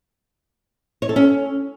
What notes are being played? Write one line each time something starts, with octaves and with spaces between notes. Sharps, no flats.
C#5
A4
C#4